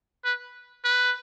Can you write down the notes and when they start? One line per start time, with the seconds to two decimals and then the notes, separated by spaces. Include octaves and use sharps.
0.25 B4
0.85 B4